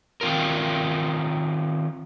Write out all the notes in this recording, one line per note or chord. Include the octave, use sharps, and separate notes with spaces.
D#3 C4 F4 A#4